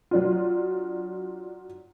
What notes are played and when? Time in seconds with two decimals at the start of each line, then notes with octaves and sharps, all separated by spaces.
0.11 F#3 D4 F4